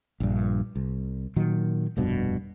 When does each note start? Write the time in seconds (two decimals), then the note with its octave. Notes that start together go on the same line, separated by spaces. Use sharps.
0.20 A#1 G2
0.76 C2
1.36 A#2 D#3 F#3
1.97 F1 C2 G2 B2